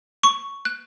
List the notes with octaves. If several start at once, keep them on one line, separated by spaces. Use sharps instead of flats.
C#6
F#6